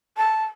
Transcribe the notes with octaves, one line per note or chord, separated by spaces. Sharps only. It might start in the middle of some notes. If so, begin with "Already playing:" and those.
A5